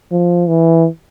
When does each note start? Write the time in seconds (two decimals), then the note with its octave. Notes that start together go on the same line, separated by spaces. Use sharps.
0.12 F3
0.48 E3